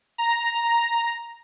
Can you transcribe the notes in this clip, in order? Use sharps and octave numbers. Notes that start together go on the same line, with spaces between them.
A#5